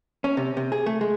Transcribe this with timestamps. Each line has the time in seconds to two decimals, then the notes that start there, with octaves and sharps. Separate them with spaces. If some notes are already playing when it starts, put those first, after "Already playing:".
0.24 C#4
0.37 C3
0.57 C3
0.72 G#4
0.86 A3
1.01 G#3